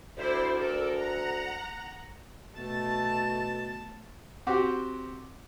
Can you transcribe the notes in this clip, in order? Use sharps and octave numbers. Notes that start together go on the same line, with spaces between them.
D2 E4 C5 D5
A4 A#4 D5
F#5 A#5
B2 A3 A5 A6
C4 F#4 G4